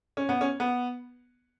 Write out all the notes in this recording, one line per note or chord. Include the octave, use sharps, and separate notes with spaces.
C#4
B3
C#4
B3